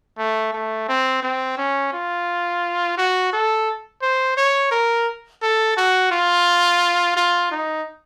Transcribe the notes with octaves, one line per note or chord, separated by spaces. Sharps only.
A3
A3
C4
C4
C#4
F4
F#4
A4
C5
C#5
A#4
A4
F#4
F4
F4
D#4